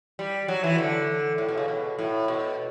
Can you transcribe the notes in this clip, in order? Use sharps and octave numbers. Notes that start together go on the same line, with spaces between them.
G3
F#3
E3
D3
A2
B2
C#3
B2
A2
B2